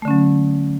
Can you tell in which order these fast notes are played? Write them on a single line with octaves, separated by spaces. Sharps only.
A3 D3 C#4 F#3